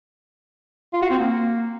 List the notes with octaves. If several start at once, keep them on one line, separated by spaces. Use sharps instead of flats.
F4
F#4
C4
A#3